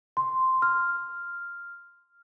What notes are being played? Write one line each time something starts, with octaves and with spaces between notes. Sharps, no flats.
C6
F6